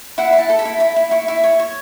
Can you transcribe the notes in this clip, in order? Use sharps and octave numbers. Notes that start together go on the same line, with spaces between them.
E4 F#5
E4
A5
A4
B5
E4
E4 B5
E4
E4 C#6
E4
C#5
C#5